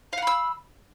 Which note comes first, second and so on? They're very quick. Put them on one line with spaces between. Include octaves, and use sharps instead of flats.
F5 F#5 B5 E6